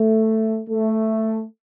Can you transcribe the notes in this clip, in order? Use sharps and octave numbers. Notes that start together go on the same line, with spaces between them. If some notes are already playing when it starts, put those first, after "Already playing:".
Already playing: A3
A3